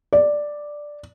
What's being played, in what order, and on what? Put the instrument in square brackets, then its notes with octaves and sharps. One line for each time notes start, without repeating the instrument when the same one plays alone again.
[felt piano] D5